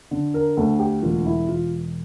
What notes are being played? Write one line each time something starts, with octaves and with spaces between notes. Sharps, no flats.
D3
A#4
D2 A4
G4
E1 F4
E4
E1 F4